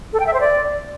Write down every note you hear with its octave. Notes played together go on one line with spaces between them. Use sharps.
A4
G5
E5
C5
D5